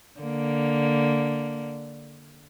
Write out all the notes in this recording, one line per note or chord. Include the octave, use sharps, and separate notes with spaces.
D3 A#3